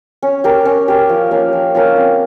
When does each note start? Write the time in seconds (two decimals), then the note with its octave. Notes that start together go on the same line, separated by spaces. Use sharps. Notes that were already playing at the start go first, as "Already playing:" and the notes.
0.22 C#4
0.44 G4 A#4
0.65 C#4
0.88 G4 A#4
1.09 F3
1.31 A#3 C#4 F4
1.53 F3
1.75 A#3 C#4 F4
1.96 C4